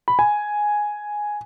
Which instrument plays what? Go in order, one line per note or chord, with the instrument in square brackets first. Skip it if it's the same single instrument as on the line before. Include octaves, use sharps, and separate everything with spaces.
[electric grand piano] B5
G#5